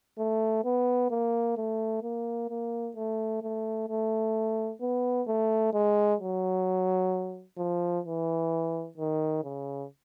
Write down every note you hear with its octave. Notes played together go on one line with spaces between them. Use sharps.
A3
B3
A#3
A3
A#3
A#3
A3
A3
A3
B3
A3
G#3
F#3
F3
E3
D#3
C#3